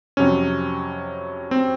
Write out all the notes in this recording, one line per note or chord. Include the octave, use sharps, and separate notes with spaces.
F2 C3 F#3 C#4
C4